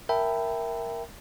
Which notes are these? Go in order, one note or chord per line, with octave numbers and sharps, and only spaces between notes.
A#4 E5 G5 A5 B5